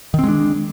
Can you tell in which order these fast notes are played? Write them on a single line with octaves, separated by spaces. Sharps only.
D#3 C4 G#3 D4